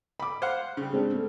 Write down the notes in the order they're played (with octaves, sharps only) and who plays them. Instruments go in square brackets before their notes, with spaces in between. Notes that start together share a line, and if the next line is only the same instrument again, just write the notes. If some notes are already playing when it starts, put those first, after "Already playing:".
[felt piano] B5 D6
[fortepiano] C5 F5 F#5
C#3 G3
[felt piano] G#3 C4 D4
A3